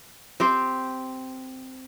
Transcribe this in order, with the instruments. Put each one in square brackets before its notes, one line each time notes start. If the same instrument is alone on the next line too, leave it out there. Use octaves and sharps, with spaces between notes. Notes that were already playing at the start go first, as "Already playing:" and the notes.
[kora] C4 G4 C5